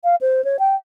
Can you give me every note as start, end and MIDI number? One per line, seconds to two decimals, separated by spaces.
0.04 0.16 77
0.21 0.44 72
0.44 0.57 73
0.59 0.75 79